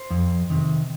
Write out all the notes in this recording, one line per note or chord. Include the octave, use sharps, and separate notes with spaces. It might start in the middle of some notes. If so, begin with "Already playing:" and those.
Already playing: C5
F2
C3 D#3